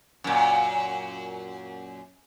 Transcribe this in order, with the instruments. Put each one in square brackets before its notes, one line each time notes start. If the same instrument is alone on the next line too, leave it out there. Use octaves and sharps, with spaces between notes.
[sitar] F#2 A#2